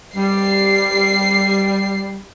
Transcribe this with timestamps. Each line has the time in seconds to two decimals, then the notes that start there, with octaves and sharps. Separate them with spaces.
0.16 G3 C7